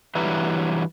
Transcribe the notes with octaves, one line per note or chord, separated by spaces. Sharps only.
G2 E3 F#3 G4 B4 A#5